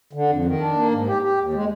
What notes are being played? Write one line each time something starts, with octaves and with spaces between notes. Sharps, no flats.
D3
F2
D#3
D4
A#3
G#2
G4
G4
D#2
G#3